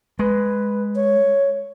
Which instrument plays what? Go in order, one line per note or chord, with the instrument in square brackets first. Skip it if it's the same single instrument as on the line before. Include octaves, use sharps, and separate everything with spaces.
[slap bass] G#3 [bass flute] B4
[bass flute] C#5